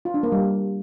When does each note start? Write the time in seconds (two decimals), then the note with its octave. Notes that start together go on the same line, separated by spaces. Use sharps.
0.05 F4
0.14 D4
0.23 A#3
0.32 G3